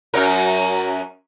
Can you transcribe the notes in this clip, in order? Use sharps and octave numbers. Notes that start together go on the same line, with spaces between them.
F#2 F#3 A#4